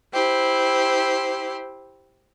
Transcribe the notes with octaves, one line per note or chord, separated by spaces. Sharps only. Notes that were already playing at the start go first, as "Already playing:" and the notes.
E4 G4 C5